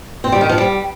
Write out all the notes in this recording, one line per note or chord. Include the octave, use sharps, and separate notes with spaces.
C4
G3
D#3
F3
G3